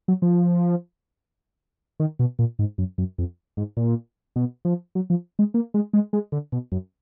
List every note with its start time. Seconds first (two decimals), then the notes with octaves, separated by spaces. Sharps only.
0.08 F#3
0.22 F3
2.00 D#3
2.19 B2
2.39 A#2
2.59 G#2
2.78 F#2
2.98 F#2
3.18 F2
3.57 G#2
3.77 A#2
4.36 B2
4.65 F3
4.95 F#3
5.10 F3
5.39 G#3
5.54 A#3
5.74 G#3
5.93 G#3
6.13 G#3
6.32 D3
6.52 B2
6.72 F#2